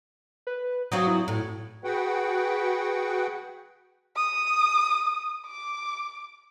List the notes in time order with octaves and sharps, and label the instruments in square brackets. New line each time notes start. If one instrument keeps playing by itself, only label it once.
[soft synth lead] B4
[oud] F#3 C4 F4 [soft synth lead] D#6
[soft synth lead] E4
[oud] A2
[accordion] F#4 G#4 B4 F#5 G5
[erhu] D#6
D6